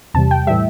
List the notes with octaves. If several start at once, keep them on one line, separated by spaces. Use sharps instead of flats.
E2 C3 G3 A5
G5
A2 E3 G3 E5